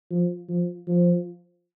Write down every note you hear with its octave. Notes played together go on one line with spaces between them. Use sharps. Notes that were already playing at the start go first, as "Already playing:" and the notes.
F3
F3
F3